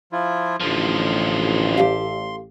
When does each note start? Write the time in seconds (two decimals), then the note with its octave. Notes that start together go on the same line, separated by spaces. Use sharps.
0.12 F3 E4 F4
0.60 A1 D3 F3 C6
1.77 G4 A4 F5